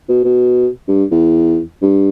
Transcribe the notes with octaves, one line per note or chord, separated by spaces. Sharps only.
B2
B2
G2
E2
G2